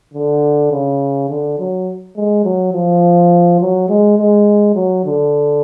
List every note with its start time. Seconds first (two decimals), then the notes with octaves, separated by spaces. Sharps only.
0.14 D3
0.72 C#3
1.29 D3
1.59 F#3
2.17 G#3
2.44 F#3
2.73 F3
3.61 F#3
3.89 G#3
4.18 G#3
4.75 F#3
5.05 D3